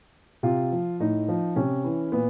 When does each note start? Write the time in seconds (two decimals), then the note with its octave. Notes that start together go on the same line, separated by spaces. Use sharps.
0.43 C3 F4
0.72 F3
1.00 A2 D#4
1.28 F3
1.56 C3 C#4
1.84 E3
2.12 A#2 B3